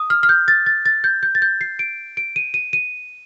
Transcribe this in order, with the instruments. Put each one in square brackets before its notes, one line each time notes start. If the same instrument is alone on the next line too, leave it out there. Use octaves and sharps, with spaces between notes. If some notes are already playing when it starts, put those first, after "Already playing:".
Already playing: [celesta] D#6
F6
F6
G6
A6
A6
A6
G6
G6
A6
G6
C7
D7
D7
D#7
D#7
D#7